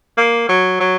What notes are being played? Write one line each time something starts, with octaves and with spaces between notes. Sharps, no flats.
A#3
F#3
F#3